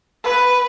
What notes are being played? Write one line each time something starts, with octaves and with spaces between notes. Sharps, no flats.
B4